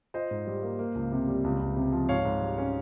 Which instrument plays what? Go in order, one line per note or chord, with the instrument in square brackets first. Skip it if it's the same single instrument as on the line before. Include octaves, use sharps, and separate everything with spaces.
[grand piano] F4 C5 D#5
G#2
G3
A#3
A#3
C#2
C3
G3
C#2
C#2
C3
F3
G#2 C#5 F5
G#2
G3
C#4